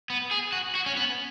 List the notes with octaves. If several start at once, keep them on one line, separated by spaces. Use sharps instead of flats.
B3
G#4
F#4
F#4
C#4
B3